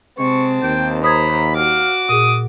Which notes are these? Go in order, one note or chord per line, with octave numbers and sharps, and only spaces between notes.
C3 G#3 C4 A5 C#6
D#2 G5
C5 A#5 B5 D#6 G#6
F#4 F5 D6
A#2 G#4 D#6